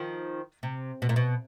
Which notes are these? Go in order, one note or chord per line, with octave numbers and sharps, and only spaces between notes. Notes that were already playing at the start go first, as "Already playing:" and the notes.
Already playing: D#3 F3
C3
B2
A#2
B2